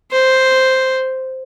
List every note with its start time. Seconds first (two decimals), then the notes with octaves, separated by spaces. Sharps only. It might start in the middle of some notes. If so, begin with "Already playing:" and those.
0.11 C5